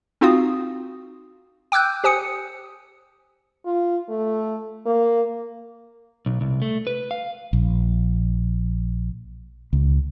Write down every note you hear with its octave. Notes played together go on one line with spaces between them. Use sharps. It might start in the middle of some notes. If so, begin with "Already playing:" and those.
C4 D#4 F4 F#4 F5 D#6
G5 D6 E6 F#6 G6
G4 C5 G#5 D#6 C#7
F4
A3
A#3
B1
C2
A3
B4
F5
A#1
C#2